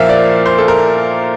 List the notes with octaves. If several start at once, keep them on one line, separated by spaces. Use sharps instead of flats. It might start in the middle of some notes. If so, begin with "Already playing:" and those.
Already playing: A#2 F3 A#3 E5 F5
D5
C5
A4
A#4